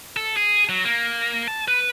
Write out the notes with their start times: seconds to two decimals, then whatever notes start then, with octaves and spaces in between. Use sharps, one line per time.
0.17 A4
0.37 G#4
0.69 F#3
0.84 A#3
1.48 A5
1.68 B4